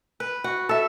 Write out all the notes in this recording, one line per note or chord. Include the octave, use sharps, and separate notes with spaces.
B4
F#4
A4 E5